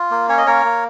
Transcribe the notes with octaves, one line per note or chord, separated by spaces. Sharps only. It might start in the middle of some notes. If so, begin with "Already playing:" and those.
Already playing: F4
A#3
C#4 C#5
D#5
A#3 A#4 C#5
A#3